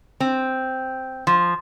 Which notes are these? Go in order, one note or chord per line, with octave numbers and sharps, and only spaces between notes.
C4
F3